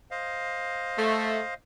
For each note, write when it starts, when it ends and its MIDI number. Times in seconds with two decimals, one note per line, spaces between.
0.11 1.54 72
0.11 1.54 75
0.11 1.54 77
0.97 1.40 57